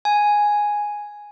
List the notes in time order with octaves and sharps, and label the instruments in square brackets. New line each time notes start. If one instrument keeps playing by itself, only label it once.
[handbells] G#5